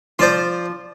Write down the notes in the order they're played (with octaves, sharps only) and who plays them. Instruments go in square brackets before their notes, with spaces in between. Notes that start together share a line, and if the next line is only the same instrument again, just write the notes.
[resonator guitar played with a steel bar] F3 [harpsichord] C5 D5 C6